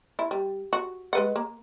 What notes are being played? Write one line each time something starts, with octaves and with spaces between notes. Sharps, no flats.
E4
G3
F#4
G#3 B4 F#5
A#3